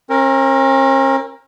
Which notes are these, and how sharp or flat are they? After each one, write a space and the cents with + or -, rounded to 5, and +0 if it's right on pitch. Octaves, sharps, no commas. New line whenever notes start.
C#4 -45 A#4 +0